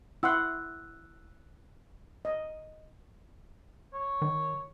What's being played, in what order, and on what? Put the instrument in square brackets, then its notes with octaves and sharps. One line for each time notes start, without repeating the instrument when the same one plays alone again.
[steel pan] E4 F#5 C6 [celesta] E6 F#6
[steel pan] D#5
[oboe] C#5
[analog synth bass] D#3